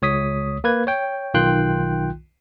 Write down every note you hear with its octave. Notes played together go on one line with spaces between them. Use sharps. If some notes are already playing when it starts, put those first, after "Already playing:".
C#2 C#5 D#6 B6
A#3 B4 G#6
C#5 G5
B1 D#3 F4 G5 C6 F#6